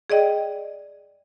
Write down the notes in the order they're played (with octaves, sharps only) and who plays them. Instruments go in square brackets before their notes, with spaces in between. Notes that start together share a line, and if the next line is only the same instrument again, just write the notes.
[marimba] G#4 D5 D#5 G5